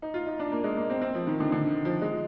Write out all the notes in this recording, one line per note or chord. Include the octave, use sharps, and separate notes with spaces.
D#4
F4
D#4
D4
A#3
G#3
A#3
C4
C4
F3
D#3
D3
D3
F3
G#3